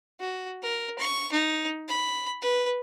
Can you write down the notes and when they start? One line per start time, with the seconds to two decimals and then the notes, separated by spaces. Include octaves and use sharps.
0.20 F#4
0.63 A#4
0.99 C#6
1.32 D#4
1.88 B5
2.42 B4